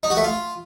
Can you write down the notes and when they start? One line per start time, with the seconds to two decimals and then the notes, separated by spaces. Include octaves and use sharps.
0.03 D#4
0.10 F#4
0.17 A3
0.24 F4